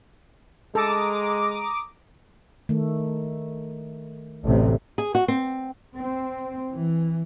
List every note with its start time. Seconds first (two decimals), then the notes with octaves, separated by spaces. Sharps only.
0.75 G#3 A4 A#5 D6 D#6
2.69 D#3 A3
4.44 A1 D2 C3
4.98 G#4
5.15 F#4
5.28 C4
5.96 C4
6.72 E3